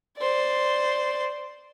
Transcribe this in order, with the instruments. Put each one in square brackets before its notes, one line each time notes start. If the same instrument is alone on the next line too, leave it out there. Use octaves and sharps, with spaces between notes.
[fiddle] C5 D5